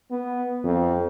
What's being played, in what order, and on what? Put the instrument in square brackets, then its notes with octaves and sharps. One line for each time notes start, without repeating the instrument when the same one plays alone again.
[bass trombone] B3
F2